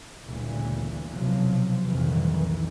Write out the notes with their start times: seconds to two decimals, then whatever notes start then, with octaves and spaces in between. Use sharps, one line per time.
0.24 G1 D2 A#2 C#3 E3
1.10 B1 C3 F3 F#3
1.87 F#1 C2 F2 A#2 D#3 E3